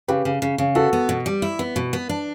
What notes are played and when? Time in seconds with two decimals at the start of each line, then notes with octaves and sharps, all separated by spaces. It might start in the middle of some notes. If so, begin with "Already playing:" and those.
0.08 C#3 G4 B4
0.25 C#3
0.42 C#3
0.58 C#3
0.75 B3 F#4 A4
0.93 B3
1.09 B2
1.26 G3
1.42 E4
1.59 B3
1.76 B2
1.93 B3
2.09 D4